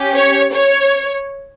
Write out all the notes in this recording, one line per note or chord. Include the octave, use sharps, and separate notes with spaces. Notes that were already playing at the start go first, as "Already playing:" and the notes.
Already playing: C#4 G4
C#5
C#5